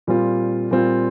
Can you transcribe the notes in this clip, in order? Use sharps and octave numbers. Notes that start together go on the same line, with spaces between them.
A#2 G3 C4 F4
A#2 G3 C4 F4